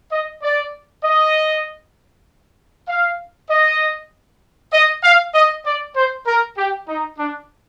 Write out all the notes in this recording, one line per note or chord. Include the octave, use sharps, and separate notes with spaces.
D#5
D5
D#5
F5
D#5
D#5
F5
D#5
D5
C5
A#4
G4
D#4
D4